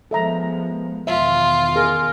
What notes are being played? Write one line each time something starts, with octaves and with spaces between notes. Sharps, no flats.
F3 G#3 B3 A4 E5 A#5
E2 B2 D#3 F4 E5
G#4 A#4